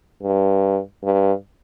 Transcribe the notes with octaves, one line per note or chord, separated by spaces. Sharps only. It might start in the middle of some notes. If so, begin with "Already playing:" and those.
G2
G2